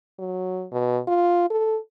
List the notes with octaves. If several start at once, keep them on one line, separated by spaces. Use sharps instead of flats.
F#3
B2
F4
A4